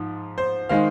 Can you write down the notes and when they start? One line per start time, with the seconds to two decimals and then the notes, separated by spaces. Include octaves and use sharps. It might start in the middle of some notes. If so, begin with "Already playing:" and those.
Already playing: G#2 F3
0.38 C5
0.69 D#3 G#3 D#4 C5 F5